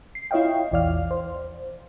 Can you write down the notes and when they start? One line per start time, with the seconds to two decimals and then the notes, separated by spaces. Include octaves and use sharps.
0.15 C7
0.31 E4 F4 C#5 D#5 F5 G5
0.71 A#1 E2 E3 D5 F5 F6
1.11 C5